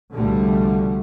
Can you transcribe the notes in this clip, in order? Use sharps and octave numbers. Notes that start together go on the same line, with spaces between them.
C2 B2 D3 F3 G3 A3